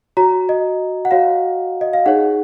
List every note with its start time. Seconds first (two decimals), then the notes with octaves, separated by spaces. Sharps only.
0.17 F#4 C#5 A#5
0.49 D#5
1.05 F#5
1.11 F#4 C#5 F5
1.81 D#5
1.93 F5
2.06 D#4 G#4 C#5 F#5